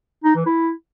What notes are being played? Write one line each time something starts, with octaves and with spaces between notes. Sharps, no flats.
D#4
E3
E4